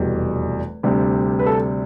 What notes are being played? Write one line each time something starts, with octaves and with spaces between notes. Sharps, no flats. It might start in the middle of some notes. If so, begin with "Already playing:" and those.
Already playing: F1 E2 B2 G3
D2 C3 G3
B4
A4